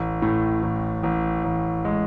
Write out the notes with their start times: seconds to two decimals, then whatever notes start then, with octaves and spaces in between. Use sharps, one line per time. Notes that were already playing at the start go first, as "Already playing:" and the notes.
Already playing: A1
0.22 A2
0.63 A1
1.03 A1
1.44 A1
1.85 G#3